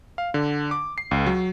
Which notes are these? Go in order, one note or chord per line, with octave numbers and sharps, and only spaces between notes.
F5
D3
D6
C7
C#2
F#3